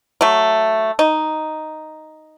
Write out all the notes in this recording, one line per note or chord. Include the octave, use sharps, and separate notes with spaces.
F#3 A3
D#4